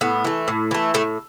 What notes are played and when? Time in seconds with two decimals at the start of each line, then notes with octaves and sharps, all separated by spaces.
0.01 A2 B3
0.25 E3 A3
0.48 A2
0.71 E3 A3
0.94 A2 A3